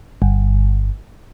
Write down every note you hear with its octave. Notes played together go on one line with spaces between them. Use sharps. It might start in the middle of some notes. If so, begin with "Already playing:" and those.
G1